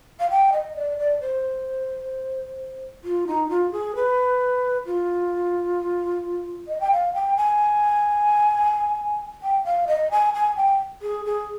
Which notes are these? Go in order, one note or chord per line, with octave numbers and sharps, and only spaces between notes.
F5
G5
D#5
D5
D5
C5
F4
D#4
F4
G#4
B4
F4
D#5
G5
F5
G5
G#5
G5
F5
D#5
G#5
G#5
G5
G#4
G#4